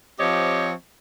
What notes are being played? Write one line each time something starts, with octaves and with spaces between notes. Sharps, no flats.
F3 C4 G4 C#5 D#5